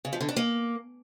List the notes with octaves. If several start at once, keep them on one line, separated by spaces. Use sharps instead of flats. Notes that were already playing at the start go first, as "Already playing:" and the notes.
C#3
F3
D3
D4
A#3